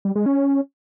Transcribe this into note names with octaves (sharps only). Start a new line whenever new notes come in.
G3
G#3
C#4